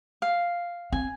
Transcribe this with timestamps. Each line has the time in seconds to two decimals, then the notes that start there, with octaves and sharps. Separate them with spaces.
0.22 F5
0.92 C4 G#5